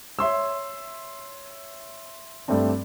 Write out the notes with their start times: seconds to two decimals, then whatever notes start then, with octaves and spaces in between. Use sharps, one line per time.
0.19 C#5 E5 C6 E6
2.48 G2 G3 A3 C4 D4